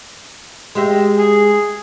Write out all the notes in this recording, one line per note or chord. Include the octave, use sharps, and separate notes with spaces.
G#3 G4 E5
G#4